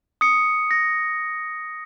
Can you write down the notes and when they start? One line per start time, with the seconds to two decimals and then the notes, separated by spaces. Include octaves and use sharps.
0.21 D#6 C#7
0.71 A#6